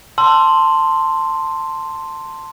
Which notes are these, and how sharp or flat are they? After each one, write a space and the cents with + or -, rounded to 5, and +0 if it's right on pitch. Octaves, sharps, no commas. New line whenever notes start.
A5 +15 C6 +0 E6 +25